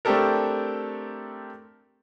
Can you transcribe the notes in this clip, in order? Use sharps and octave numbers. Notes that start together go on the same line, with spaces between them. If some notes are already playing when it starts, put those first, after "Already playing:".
A3 C4 D4 G4 A4 A#4